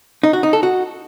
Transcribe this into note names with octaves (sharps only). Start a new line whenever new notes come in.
D#4
F#4
D#4
A4
F#4